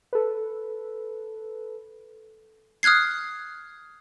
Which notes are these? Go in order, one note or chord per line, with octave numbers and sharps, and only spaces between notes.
A4 B4
D#6 F6 F#6 G#6 C7